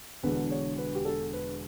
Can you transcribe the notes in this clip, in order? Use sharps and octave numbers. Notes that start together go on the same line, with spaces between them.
E1 E2 D3 B4
C#5
B4
G4
A4
B4